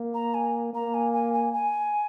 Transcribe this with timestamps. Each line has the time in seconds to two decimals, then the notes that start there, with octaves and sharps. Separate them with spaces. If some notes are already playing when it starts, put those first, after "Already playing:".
Already playing: A#3
0.14 A#5
0.34 G#5
0.73 A#3 A#5
0.94 G#5
1.13 G#5
1.33 G#5
1.53 G#5